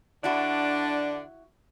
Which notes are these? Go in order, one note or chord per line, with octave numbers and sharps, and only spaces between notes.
D3 D4 E4 F#4